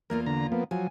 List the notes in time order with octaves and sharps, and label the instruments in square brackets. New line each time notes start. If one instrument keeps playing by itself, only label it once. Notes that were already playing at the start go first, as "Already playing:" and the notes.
[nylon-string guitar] E2 A#3 F4 [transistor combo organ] A#4
[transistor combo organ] D3 A#5
F3 A#3 B3
[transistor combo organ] F3 F#3 [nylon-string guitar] G#5